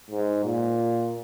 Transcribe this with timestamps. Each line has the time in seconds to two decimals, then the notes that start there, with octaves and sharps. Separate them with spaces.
0.10 G#2
0.45 A#2